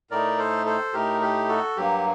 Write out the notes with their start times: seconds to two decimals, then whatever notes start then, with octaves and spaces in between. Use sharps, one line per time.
0.11 A2 A3 D#4 A#4 D5
0.38 A4 C5
0.66 A4 C5
0.93 A2 A3 D#4 G4 A#4
1.22 G4
1.49 F#4 A4
1.77 G2 F#3 A#3 G4